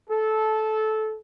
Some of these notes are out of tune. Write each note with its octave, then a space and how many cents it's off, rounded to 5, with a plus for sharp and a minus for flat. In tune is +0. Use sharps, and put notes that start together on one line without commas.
A4 -15